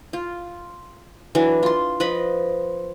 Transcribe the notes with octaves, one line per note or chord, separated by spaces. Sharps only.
F4
E3 F#3 D4
F4 C6
F3 B4 D#5 B5